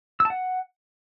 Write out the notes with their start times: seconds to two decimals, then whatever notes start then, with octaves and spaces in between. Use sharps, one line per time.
0.20 E6
0.25 A5
0.30 F#5